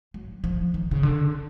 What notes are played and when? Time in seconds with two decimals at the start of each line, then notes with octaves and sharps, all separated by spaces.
0.14 F#3
0.44 F3
0.74 D#3
0.91 C#3
1.03 D3